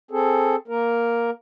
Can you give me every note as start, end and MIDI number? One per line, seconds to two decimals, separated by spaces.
0.11 0.56 60
0.11 0.56 68
0.11 0.56 69
0.68 1.30 58
0.68 1.30 70